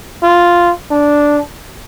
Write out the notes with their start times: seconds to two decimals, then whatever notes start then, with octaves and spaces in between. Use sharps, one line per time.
0.23 F4
0.91 D4